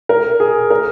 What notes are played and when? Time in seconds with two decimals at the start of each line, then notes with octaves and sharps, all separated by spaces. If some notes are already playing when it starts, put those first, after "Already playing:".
0.09 A#4
0.40 G#4
0.70 A#4